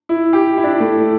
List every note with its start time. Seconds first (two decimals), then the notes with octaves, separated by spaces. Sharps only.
0.09 E4
0.33 G4
0.57 E4
0.64 D4
0.72 E4
0.80 A3